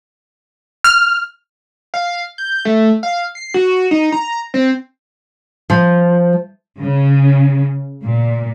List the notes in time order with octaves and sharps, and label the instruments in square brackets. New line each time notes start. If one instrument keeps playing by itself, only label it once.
[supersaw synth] F6
[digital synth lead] F5
G6
A3
F5
C7
F#4
D#4
A#5
C4
[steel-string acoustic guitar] F3
[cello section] C#3
A#2